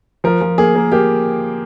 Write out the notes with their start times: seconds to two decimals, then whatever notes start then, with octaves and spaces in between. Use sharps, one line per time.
0.24 F3 A#4
0.41 F3
0.58 A#3 G#4
0.75 A#3
0.92 A#3 G4